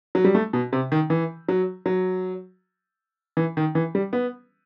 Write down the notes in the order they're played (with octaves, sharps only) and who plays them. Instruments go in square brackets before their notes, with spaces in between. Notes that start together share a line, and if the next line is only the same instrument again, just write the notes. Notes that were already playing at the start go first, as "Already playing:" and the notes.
[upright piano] F#3
G3
A3
B2
C3
D#3
E3
F#3
F#3
E3
D#3
E3
G3
B3